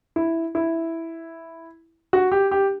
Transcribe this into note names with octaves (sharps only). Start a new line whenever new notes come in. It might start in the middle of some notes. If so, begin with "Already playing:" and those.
E4
E4
F#4
G4
G4